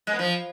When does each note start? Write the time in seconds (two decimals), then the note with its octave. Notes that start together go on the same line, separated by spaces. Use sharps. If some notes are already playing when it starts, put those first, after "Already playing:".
0.07 G#3
0.13 B3
0.19 F3